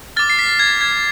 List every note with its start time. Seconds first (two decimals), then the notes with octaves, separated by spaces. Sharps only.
0.16 D6 F6 A6
0.30 C7
0.39 B6
0.59 G#6
0.81 G#6